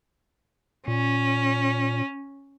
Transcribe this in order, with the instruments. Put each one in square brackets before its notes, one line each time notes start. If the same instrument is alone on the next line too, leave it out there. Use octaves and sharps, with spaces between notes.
[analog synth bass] A#2 [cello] C#4